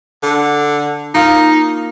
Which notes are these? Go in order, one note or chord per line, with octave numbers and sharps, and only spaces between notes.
D3
A#3 D#4 F4